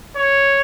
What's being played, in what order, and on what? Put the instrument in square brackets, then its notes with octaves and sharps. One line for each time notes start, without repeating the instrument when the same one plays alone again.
[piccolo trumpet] C#5